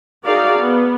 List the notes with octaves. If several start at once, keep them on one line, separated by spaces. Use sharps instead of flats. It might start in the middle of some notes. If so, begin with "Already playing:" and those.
D#4 F#4 G#4 A#4 D5 F5
B3